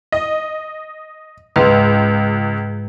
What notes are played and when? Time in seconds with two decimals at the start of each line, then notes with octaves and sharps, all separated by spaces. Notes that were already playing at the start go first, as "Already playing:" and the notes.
0.12 D#5
1.56 C#2 G#2 G#3 B4